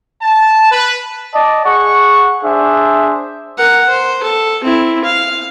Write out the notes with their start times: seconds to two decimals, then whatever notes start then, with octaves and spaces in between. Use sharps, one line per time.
0.22 A5
0.71 B4
1.34 D5 D#5 A5
1.65 G#4 F#5 C#6
2.43 D4 G#4 C5 E5
3.58 A#4 F#5
3.89 C5
4.23 A4
4.64 C4 E4
5.04 F5